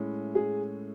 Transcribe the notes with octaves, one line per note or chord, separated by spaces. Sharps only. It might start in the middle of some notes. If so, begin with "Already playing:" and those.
Already playing: A2 G#3 C#4 E4
G#4